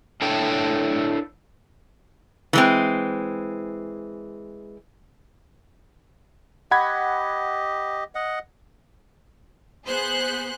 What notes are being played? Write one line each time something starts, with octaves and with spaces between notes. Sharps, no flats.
D4 E4 A4 C#5 G5 A5
E3 G#3 C4
G4 D#5 F#5 B5 G#6
D#5 F#5
B3 G#4 C5 F#6